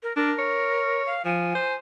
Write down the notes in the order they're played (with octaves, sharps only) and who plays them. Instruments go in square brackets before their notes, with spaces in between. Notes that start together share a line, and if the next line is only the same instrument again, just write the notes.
[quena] A#4
[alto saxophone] D4 [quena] A#4
[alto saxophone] C#5
[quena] F5
[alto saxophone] F3 [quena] G#5
[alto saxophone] C5